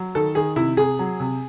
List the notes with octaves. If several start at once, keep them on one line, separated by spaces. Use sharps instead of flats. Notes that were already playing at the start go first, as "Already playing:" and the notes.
Already playing: F#3
D#3 A4
D#3 G#4
C3 E4
C3 G#4
F#3
C3